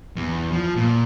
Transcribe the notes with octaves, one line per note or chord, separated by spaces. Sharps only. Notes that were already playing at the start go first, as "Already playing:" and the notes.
E2
F3
A#2